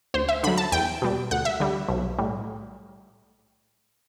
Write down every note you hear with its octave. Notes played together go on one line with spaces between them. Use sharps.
D2 C5
E5
D3 F#3 B5
A5
E2 G5
B2 G3
D2 F#5
E5
D3 G3
B1
A2 G3